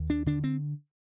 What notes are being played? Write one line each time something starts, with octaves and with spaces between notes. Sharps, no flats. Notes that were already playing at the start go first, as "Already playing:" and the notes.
Already playing: D#2
D4
D3 D4
C4